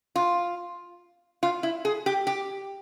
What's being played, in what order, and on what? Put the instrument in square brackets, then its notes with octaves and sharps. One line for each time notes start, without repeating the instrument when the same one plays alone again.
[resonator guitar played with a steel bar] F4
F4
E4
G#4
G4
G4